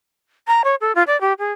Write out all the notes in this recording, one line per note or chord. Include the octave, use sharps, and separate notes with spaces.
A#5
C#5
A4
F4
D5
G4
G#4